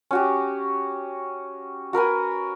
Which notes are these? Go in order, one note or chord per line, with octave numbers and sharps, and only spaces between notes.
C#4 F#4 G4
F#4 A#4 B4 G#5